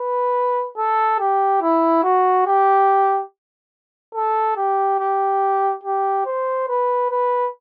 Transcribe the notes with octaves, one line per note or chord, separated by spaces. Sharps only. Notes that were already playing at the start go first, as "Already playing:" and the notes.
Already playing: B4
A4
G4
E4
F#4
G4
A4
G4
G4
G4
C5
B4
B4